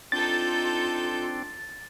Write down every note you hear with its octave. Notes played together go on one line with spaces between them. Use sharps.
C4 D4 D#4 F4 A4 G6 A6